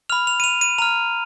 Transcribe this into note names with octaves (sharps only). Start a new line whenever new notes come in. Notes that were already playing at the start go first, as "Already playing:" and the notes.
B5 F6 F7
F7
D#7
F7
D#7
A#5 F6 F7